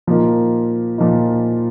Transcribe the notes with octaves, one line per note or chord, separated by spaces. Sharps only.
A#2 F3 A#3 D#4
A#2 F3 A#3 D#4